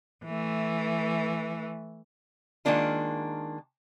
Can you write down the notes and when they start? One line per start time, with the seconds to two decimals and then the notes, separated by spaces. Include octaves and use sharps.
0.25 E3 A3
2.65 D#3 F3 G#3 A#3 D4 F4